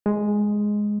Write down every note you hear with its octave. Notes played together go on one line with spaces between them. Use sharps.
G#3